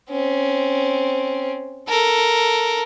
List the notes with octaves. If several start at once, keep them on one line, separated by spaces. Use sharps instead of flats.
C4 C#4
A4 A#4